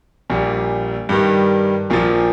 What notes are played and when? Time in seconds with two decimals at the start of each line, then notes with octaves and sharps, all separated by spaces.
0.30 A#1 A#2 G3
1.09 G2 D#3 G3
1.90 A#1 A#2 F3